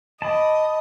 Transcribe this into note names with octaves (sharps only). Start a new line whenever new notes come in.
D#5 A5 B5 D6